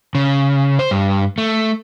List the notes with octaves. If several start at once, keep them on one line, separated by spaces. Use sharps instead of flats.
C#3
C5
G2
A3